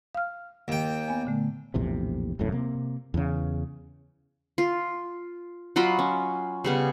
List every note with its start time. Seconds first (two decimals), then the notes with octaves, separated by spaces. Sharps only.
0.15 F5 F6
0.68 D#2 G5
1.08 B3 G#5
1.25 A#2 D3 A3
1.74 A#1 E2 A2 C3
2.39 E1 C2 F#2 A2
2.52 C3 A#3
3.14 E2 C#3
4.58 F4
5.76 F#3 F4 D#5 B5
5.99 C#4
6.64 C#3 G3 B3